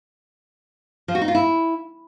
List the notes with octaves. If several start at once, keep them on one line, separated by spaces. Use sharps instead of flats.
F3
F#4
D#4
F4
E4